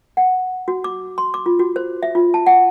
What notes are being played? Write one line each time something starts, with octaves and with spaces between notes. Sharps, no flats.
F#5
F#4
D6
C6
D6
F4
F#4
C5
E5
F4
A5
F#5